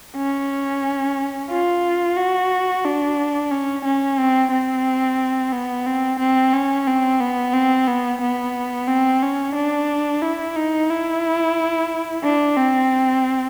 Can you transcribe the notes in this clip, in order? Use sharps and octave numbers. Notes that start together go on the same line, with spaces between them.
C#4
F4
F#4
D4
C#4
C#4
C4
C4
B3
C4
C4
C#4
C4
B3
C4
B3
B3
C4
C#4
D4
E4
D#4
E4
D4
C4